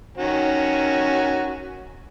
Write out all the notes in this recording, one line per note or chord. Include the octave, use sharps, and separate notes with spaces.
D#3 C#4 F#4